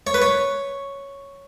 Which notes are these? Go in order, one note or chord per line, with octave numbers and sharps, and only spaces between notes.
C#5
B4
C#5